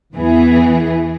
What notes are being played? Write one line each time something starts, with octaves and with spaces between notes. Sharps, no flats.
E2 E3 B3 G#4